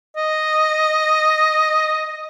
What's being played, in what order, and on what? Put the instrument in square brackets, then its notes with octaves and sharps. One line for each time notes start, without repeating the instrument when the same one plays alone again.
[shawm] D#5